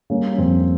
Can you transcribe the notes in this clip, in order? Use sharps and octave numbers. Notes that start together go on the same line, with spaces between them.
G3 A#3 C#4
C#4
F2 C4